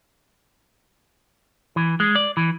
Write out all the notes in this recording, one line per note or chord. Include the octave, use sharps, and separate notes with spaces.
E3
G#3
D5
E3